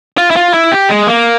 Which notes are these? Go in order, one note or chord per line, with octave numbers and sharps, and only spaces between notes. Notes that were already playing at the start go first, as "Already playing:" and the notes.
F4
E4
F4
E4
G4
G#3
A#3